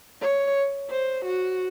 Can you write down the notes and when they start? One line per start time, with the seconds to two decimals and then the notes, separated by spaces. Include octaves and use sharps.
0.21 C#5
0.91 C5
1.26 F#4